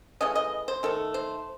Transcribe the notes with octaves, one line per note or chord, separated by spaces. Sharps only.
C#3 E3 A3 D#5
D#5
C5
D#3 A3 A4
C5